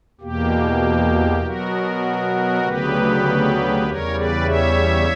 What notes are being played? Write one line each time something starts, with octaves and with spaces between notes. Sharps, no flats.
E2 B2 A#3 G4
B2 F#3 B3 F#4 A#4
D2 C#3 F#3 B3 G4 B4
E2 C#3 G3 A#4 C#5
B4 D5
C#5 E5